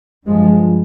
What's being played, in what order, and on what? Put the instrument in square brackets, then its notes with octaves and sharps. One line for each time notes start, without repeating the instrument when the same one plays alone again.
[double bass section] G2 F3 G#3